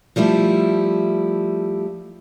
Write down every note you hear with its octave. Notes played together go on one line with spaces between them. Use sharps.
F3 G3 A3 E4